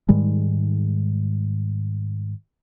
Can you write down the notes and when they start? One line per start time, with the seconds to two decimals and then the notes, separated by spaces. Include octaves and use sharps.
0.09 G#2 D#3 G3 G#3